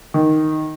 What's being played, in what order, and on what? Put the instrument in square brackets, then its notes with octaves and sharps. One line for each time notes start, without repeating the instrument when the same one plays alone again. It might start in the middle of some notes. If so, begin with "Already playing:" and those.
[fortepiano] D#3